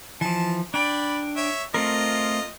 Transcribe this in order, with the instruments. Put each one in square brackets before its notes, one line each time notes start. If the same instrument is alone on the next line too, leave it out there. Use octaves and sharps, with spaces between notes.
[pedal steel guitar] E3 F3 [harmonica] A5
[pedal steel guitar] D4 G5 [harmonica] D5 B5
[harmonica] C#5 E5
[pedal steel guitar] A3 C4 A#4 [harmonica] F4 D#5